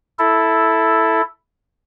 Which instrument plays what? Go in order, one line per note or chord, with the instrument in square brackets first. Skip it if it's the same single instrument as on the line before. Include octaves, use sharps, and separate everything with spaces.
[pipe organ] E4 A4